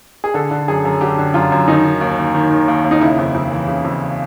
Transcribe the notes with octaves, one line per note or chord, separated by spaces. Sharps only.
G#4
D3 A4
D3
F#2 G#4
F#2
D3 G4
D3
F#2 F4
F#2
D#3 D#4
D#3
D#2
D#2
D#3
D#3
D#2
D#2
D#4
C#3 E4
F2
F2
E3
C#3
F2